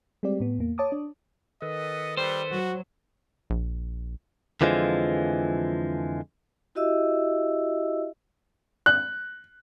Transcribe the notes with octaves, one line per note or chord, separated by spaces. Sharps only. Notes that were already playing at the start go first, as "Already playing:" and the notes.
G3 G#3 C4 G4 D5
A2 B3
E2 A#3
C#5 A5 D6 D#6
D4
D#3 A4 B4 D#5
G3 C5
F#3 F#4
A#1
F2 D3 E3 F3 G#3
E4 F#4 G4 D#5 E5 E6
F#6